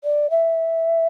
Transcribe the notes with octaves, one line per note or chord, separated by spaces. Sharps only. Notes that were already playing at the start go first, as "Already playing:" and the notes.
D5
E5